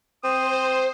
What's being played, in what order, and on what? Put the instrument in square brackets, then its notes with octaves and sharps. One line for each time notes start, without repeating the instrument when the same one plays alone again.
[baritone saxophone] C4 [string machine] C5 [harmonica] D#6